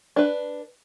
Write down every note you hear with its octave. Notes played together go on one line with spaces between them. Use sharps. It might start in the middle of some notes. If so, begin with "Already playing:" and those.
D4 B4